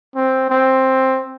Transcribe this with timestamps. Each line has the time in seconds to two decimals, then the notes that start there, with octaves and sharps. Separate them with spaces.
0.15 C4
0.50 C4